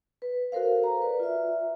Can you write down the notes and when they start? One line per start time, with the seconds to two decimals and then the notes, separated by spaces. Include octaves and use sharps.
0.22 B4
0.52 F#4 A4 A#4 C5 F5
0.84 A#5
1.02 B4 D5
1.20 F4 E5